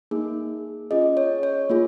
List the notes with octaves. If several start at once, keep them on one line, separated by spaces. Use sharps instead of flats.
A#3 D#4 G#4
C#4 F4 G#4 D#5
C#5
C#5
A#3 F4 G#4